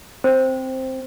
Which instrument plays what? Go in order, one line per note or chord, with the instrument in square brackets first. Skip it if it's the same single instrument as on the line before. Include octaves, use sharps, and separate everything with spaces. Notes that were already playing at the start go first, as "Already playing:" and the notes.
[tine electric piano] C4 [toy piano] C5